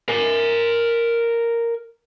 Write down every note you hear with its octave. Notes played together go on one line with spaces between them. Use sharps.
A#4 G#5